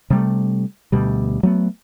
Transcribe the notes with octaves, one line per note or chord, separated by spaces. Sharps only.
C3 G3 A3
D2 B2 G3
F#3 A3 B3